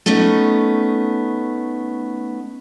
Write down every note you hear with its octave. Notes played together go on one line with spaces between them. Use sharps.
A3 B3 C#4 D#4